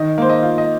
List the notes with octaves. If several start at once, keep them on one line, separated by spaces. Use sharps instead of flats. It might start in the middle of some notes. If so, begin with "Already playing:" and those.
Already playing: D#3 D#5
A#3 C5
D#5
F4
D#5